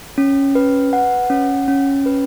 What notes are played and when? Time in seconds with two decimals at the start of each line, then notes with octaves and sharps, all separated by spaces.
0.18 C#4
0.55 B4
0.93 F#5
1.30 C#4
1.68 C#4
2.06 B4